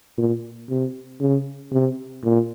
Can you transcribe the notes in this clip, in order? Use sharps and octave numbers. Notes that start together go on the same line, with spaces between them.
A#2
C3
C#3
C3
A#2